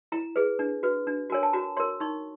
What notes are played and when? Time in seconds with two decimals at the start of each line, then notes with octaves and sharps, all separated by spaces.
0.12 E4 A#5
0.36 G#4 B4
0.59 D4
0.83 F#4 B4
1.07 D4
1.30 F#4 A#4 C#5 G#5
1.43 A5
1.53 F#4 A#5
1.77 A#4 C#5 C6
2.00 D#4 C#6